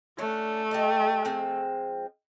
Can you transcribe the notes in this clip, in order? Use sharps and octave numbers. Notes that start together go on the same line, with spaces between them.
A3 C#4 D4
G4 D#5
F3 G#3 C4